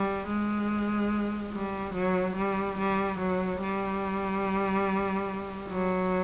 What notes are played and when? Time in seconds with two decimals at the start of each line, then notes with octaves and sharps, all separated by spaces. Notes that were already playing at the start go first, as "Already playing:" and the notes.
Already playing: G3
0.28 G#3
1.53 G3
1.94 F#3
2.36 G3
2.78 G3
3.19 F#3
3.61 G3
5.69 F#3